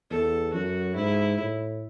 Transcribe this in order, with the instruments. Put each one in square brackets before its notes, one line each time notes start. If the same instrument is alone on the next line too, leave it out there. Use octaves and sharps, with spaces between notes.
[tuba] E2 [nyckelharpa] A4
[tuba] F#2 [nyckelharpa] F#4
[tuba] G#2 [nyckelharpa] E4
[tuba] A2